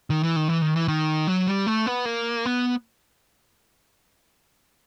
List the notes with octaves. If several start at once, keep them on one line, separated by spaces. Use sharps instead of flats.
D#3
E3
D#3
E3
D#3
E3
D#3
F#3
G3
A3
B3
A#3
B3